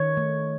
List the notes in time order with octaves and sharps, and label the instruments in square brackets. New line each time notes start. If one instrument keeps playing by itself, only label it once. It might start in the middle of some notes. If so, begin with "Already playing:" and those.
Already playing: [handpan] D#3 C#5
A3